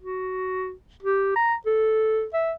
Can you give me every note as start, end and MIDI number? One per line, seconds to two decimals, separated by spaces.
0.01 0.72 66
1.03 1.34 67
1.36 1.54 82
1.66 2.25 69
2.34 2.52 76